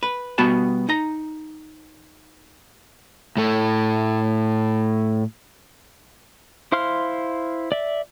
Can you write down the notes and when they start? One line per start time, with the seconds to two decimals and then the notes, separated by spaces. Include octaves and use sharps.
0.03 B4
0.38 B2 G3 B3 F#4 B4 A5
0.89 D#4 A#5
3.37 A2 A3
6.72 E4 C5 F5 C6 F6
7.72 D5 E5